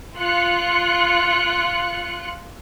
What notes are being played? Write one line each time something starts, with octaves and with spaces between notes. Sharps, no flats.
F4 F#6 C#7